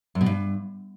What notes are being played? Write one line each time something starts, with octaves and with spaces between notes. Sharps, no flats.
F#2
B2
G2